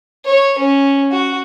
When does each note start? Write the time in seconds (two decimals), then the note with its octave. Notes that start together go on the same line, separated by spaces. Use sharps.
0.25 C#5
0.58 C#4
1.11 F#4